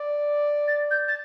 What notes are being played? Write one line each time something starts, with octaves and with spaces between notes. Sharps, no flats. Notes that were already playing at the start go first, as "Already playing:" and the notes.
Already playing: D5
A6
G6
A6